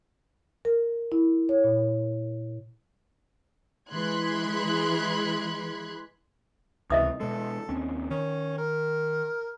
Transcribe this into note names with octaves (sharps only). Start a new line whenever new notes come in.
A#4
E4
C#5
A#2
E3 G#3 B5 C6 F#6 G#6
C#2 C3 E3 D#5 E5 D#6
B2 G#3 A4
D#2 C4 C#4
D#3 C#4
A#4